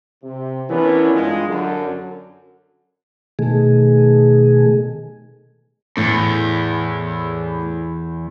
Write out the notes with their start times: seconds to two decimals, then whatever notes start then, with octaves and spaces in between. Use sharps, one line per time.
0.23 C3
0.70 E3 B3 C#4 D4 A#4 C#5
1.13 G2 G#3 F4
1.47 F#2 D3
3.39 B2 D#3 A3 G#4
5.97 E2 A2